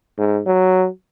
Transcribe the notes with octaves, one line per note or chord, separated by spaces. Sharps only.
G#2
F#3